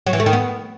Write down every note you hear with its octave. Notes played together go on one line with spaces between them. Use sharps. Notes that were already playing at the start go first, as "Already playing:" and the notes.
F#3
E3
A3
D#3
B3